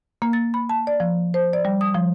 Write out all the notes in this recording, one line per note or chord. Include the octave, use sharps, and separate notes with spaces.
A#3
A6
B5
A5
D5
F3
C5
D5
G3
D#6
F3